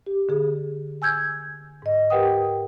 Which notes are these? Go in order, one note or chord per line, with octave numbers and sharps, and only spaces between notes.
G4
D3 G#4
G#5 E6 G6 G#6
G#2 D#5
G4 A#4 B4 F#5 G5 D#6